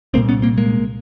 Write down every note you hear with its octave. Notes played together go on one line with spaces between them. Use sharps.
C2 A#2 A#3 C4
B3 C#4
A#3 C4
G#3 A#3